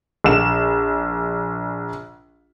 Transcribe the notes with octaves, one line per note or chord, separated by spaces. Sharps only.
A#1 E7